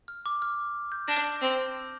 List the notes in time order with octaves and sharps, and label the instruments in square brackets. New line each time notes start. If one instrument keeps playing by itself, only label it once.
[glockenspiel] F6
D6
F6
G6
[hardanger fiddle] D4 [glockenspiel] A#6
[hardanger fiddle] C4